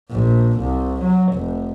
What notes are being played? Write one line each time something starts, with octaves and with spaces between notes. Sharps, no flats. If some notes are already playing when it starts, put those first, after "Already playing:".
A#1
C2
F#3
F1